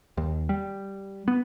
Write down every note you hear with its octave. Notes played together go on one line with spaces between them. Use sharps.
D#2
G3
B3